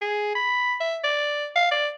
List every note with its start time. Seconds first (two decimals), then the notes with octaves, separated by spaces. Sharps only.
0.01 G#4
0.35 B5
0.80 E5
1.04 D5
1.56 F5
1.71 D5